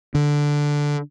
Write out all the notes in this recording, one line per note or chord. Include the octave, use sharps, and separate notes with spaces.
D3